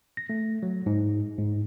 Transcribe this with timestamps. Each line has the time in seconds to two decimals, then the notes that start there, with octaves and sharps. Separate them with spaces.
0.17 A#6
0.29 A3
0.63 F#3
0.86 G#2
1.38 G#2